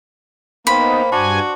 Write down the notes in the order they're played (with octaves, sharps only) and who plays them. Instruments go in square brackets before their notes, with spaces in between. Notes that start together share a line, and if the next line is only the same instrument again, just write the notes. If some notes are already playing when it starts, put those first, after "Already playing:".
[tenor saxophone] A#3 [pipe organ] B3 D#4 [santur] B4 C5 G5 [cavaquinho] B5
[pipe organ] G2 G#5 [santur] D4 F5 A5 [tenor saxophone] F#4